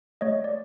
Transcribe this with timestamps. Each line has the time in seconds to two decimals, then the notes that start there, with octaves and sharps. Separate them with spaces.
0.21 A3 C#5 D#5
0.44 D5